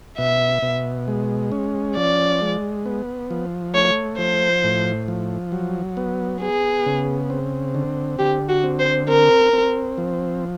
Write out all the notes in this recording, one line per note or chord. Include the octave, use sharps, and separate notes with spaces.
B2 E5
B2
G#3
C#4
F3 D5
G#3
B3
F3
A3 C#5
F3 C5
A2
F3
F#3
B3
B3 G#4
C#3
C4
D3
D3 G4
F#4
C4
C5
C4 A#4
C4
F3